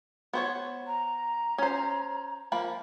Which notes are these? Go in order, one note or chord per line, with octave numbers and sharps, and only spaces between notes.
B3 C5 C#5
A#5
C#4 C5
F3 A#3 B5